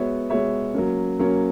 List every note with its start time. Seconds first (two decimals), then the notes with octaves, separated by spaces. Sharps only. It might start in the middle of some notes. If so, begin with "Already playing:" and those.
Already playing: G#3 B3 F#4 C#5 E5
0.30 G#3 B3 F#4 C#5 E5
0.74 F#3 A#3 C#4
1.19 F#3 A#3 C#4